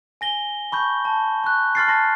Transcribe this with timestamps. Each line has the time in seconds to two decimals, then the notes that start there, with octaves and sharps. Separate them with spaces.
0.21 G#5 A#6 G7
0.72 A5 B5 C#6 G6
1.05 A5
1.44 C#6 F#6
1.75 C6 F6 A6 C7
1.88 A5 C6 A#6